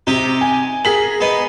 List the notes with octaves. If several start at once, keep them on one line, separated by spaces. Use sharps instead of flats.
C3 D#4 G4
G#5
G#4 A#4 B6 F#7
B3 D#4